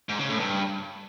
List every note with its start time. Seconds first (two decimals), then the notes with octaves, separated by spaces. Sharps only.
0.09 G#2
0.19 C#3
0.29 A2
0.40 G2